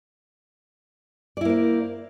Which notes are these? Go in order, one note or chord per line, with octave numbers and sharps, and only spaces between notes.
A#3 E4 C5 D5